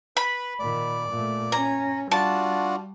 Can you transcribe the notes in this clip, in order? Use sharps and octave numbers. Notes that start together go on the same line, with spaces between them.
B4 B5
A#2 D#3 D5
A#2 A3
C#4 A#5
G3 D4 F4 F#4 A5